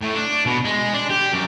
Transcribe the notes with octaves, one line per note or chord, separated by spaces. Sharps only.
A2
D4
B2
G#3
D4
G4
F#2